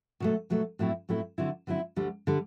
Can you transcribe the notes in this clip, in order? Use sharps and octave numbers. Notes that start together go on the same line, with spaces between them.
B2 F#3 A3
B2 F#3 A3
A2 F#3 A3 C4 E4
A2 F#3 A3 C4 E4
D3 F#3 C4 E4
D3 F#3 C4 E4
D2 D3 G3
D3 G3